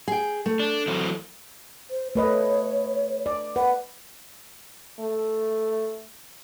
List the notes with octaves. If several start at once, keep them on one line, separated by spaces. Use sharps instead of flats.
G#4 G5
A3
D4
E3 F#3 C4
C5
A3 B4 C#5 D#5
D5
B4 F#5
A3